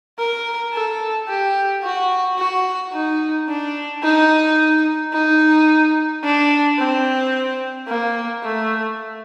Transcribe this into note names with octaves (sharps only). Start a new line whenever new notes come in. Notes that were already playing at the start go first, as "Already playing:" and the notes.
A#4
A4
G4
F#4
F#4
D#4
D4
D#4
D#4
D4
C4
A#3
A3